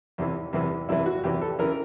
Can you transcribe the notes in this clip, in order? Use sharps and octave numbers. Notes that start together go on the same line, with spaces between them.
E2 C3 E3
E2 C3 E3
E2 C3 E3 E4
F#4
E2 C3 E3 G4
A4
C#3 E3 A#4